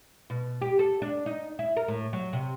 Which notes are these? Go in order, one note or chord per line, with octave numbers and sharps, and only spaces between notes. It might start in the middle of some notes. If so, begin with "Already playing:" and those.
B2
G4
A4
D4
D#4
E4
A#4
A2
F#3
C3